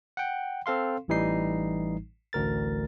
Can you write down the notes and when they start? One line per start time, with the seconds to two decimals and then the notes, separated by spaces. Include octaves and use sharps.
0.17 F#5 G5
0.66 C4 A4 F5 C6
1.08 A1 A2 E3 G3 D#4 C7
2.33 A1 D2 A#4 A6